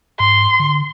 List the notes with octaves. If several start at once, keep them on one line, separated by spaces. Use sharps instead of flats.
G#2 C6
D3